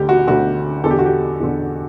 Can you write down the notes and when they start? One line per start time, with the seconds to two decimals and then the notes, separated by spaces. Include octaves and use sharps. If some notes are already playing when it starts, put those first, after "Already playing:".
Already playing: D2 D3 G4
0.09 F#4
0.27 D2 D3 F#4
0.84 E2 D3 A4
0.91 G4
0.99 F#4
1.06 G4
1.40 E2 D3